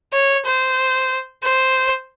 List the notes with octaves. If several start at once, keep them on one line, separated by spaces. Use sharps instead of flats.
C#5
C5
C5